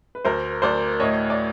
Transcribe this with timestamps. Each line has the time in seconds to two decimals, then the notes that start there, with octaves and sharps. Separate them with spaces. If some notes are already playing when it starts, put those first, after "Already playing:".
0.15 B4
0.25 D2 A#4 C5
0.62 D2 C5 D5
1.00 A2 C#5 D#5
1.30 D5